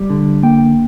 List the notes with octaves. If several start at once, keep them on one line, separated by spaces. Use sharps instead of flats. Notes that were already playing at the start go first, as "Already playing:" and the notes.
Already playing: G3
D3
A#3 G5